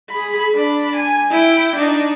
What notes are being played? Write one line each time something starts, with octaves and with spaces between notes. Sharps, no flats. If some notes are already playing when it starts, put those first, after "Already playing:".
G#4 B5
D4 B5
G#5
E4 G5
D4 D#4